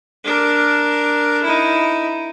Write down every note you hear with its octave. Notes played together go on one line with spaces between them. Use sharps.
D4 A#4
D#4 E4